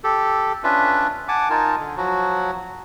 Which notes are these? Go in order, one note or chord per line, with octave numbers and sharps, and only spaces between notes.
G4 A4
C#4 D4 F4 B4 E5
F#5 G#5 A5 D6
D#4 F4 A#4 G#5 A5
D3
F3 F#3 F#4